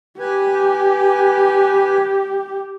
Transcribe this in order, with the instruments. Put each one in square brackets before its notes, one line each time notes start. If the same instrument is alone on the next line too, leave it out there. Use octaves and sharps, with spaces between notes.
[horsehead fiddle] G4 [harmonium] B4 G#5